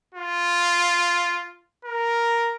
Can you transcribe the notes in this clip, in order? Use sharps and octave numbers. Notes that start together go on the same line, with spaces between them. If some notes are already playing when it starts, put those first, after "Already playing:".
F4
A#4